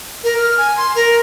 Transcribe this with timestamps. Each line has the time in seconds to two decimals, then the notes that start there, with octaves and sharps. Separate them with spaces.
0.24 A#4
0.37 F6
0.58 G#5
0.77 C6
0.95 A#4